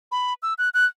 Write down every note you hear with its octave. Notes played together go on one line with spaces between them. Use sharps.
B5
E6
F#6
F#6